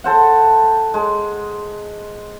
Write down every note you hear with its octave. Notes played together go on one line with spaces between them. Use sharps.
A4 C5 F#5
G#3